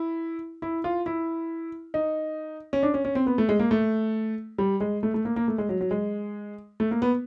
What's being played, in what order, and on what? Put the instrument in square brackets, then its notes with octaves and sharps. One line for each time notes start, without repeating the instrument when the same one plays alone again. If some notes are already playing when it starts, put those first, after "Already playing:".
Already playing: [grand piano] E4
E4
F4
E4
D#4
C#4
D4
C#4
C#4
C4
B3
A3
G#3
A#3
A3
G3
G#3
A3
A3
A#3
A#3
A3
G#3
F#3
F#3
G#3
A3
A#3
B3